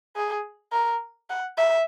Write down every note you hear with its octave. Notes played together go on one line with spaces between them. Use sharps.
G#4
A#4
F#5
E5